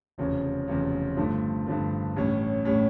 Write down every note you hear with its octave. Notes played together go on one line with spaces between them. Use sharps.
F1 E2 C#3 F3 C#4
F1 E2 C#3 F3 C#4
G2 D3 F3 A3
G2 D3 F3 A3
A1 A2 G3 C#4
A2 G3 C#4